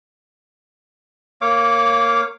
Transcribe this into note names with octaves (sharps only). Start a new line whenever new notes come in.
A#3 C#5 F5 D6